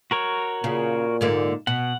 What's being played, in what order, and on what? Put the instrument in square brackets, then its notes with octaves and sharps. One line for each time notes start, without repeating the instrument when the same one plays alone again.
[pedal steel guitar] F#4 A#4 C#5
[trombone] A#2 [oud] C#3
[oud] G#2 D3 A#3
[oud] B2 [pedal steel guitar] F#5